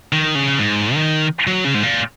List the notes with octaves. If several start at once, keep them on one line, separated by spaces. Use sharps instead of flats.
D#3
C#3
G#2
D#3
F#3
C#3
G#2
A#2